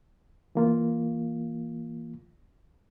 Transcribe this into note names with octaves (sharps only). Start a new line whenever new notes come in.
E3 A#3 F4